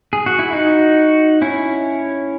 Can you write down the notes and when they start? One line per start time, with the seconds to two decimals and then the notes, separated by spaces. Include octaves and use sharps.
0.13 G#4
0.26 F#4
0.39 E4
0.53 D#4 F#4
1.42 C#4 E4